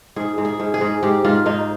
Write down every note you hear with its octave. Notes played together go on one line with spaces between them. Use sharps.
G#2 G#4
G#2
G#4
G#2
G#4
G#2
G#2 G4
G#2 F4
G#2 D#4